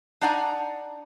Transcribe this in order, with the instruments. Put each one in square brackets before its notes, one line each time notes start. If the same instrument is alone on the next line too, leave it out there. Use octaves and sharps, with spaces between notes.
[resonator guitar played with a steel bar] D4 D#4 D5 F#5 G#5 A#5